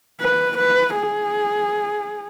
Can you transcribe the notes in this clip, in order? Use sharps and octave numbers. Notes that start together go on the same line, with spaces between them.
B4
B4
G#4